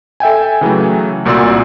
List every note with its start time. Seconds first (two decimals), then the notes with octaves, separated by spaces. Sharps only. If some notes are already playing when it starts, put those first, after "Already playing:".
0.20 A4 E5 G5 G#5
0.61 C#3 E3 F#3 A3
1.25 C2 A#2 F#4 D5 C6 E6